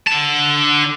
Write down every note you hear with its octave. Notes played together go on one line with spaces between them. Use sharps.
D3 A5